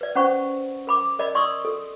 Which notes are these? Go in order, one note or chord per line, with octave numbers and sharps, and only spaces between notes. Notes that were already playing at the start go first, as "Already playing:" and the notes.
B4 D5
C#4 C5 F#5 B5 C#6
A#4 B5 D6
A#4 D5 D#5 B5
D5 C6 C#6 D#6 E6
A4